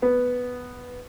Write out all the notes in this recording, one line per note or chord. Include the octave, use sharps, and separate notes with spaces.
B3